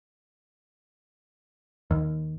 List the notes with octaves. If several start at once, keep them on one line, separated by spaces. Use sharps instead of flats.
D#2